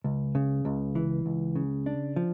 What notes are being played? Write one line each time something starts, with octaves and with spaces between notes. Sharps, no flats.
C#2
C#3
C#2
E3
C#2
C#3
D4
F3